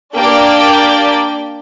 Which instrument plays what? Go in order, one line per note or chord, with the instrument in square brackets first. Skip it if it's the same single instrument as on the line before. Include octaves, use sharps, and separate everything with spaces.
[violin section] A#3 D4 G4 D5 G5